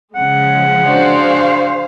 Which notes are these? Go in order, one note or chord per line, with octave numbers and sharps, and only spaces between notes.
C#3 F3 G#3 F#5
D4 F#4 G#4 C5 F5